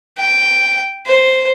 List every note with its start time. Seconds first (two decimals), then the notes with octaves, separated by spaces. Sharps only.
0.18 G5
1.06 C5